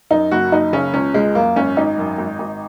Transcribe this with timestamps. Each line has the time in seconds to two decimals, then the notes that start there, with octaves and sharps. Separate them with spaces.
0.11 F#2 D#4
0.31 F#1 F#4
0.52 F#1 D#4
0.73 C#3 C#4
0.94 C#2 C#4
1.14 C#2 G#3
1.35 F#2 A#3
1.56 G#1 C#4
1.77 G#1 D#4
1.98 F#2
2.18 G#1
2.39 G#1